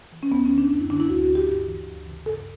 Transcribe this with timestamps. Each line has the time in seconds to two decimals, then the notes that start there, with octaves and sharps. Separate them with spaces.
0.12 E3
0.23 C#4
0.32 D2 B3
0.45 C#4
0.51 D3
0.58 D4
0.71 F#2 D4
0.80 E4
0.90 D3 D4
1.00 E4
1.09 D2 F#4
1.22 F#4
1.29 D3
1.35 G4
1.49 G2 G4
1.67 E3
1.87 D2
2.06 C#3 E3
2.26 G2 A4